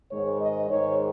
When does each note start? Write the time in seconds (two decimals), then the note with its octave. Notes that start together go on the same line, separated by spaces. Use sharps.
0.11 G#2 D#3 G#3 C#5
0.41 D#5
0.70 G#2 D#3 G#3 C#5